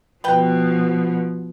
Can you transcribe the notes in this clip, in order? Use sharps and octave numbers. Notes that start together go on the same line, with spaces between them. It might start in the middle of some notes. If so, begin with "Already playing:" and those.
B2 F3 B4 G5